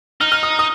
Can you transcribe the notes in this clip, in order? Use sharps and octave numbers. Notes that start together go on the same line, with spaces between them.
D#4 F6
F6
D#6
D#6